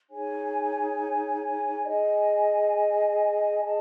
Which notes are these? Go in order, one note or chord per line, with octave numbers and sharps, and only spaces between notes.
D#4 G#4 C#5 G#5
G#4 D#5 G#5
G#4 D#5 A5